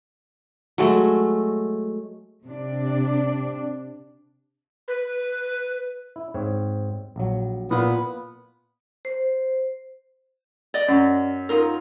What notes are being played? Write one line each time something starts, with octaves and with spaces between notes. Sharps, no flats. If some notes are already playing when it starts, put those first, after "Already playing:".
F#3 G#3 A3
C3 D4
B4
E4
G#2 C4 C#5
A#1 F#3
A#2 B3
C5
D5 D#5
F#2
D#4 F4 A#4